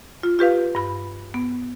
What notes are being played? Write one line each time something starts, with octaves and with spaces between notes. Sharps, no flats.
F4
F4 G4 B4 F5
G2 B5
B3